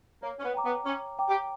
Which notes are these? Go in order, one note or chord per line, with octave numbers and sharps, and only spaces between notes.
A#3 C#5
C#4
B3
G5 A#5 D6
B3
C#4 C#5
G5 A#5 D6
G4